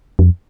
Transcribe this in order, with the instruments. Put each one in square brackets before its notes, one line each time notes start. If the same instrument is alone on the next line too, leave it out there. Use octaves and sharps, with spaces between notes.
[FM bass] F2